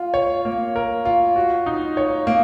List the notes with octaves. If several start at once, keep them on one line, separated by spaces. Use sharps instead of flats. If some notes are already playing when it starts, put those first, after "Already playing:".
Already playing: F4
C#5
A#3
A#4
F4
F#4
D#4
C#5
A#3